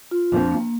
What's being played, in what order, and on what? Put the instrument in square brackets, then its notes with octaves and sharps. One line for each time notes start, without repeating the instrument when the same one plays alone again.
[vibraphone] F4
[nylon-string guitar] F2 F3 C4 [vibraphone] D4
[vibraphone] A#3